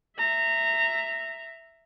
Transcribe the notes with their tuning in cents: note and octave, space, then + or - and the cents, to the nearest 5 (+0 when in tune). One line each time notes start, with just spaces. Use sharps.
E5 +0 A#5 -20